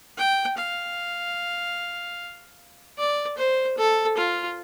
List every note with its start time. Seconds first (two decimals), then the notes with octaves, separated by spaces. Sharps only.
0.18 G5
0.58 F5
2.98 D5
3.38 C5
3.78 A4
4.18 F4